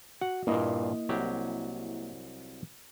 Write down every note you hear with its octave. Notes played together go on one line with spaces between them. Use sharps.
F#4 F#5
G2 A#2 A#3 E4 D#5
C2 F#3 G4